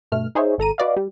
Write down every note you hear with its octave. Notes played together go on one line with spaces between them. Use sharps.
G2 B2 A3 F6
D#4 G#4 C5 C#5 E5
G#1 A4 A#5 D#7
F#4 B4 D5 D#5 F5
G3